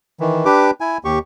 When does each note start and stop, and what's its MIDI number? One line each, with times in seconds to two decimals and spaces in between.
0.20 0.45 51
0.20 0.45 52
0.45 0.71 62
0.45 0.71 67
0.45 0.71 71
0.45 0.71 86
0.81 0.98 64
0.81 0.98 80
1.05 1.19 39
1.05 1.19 67
1.05 1.19 85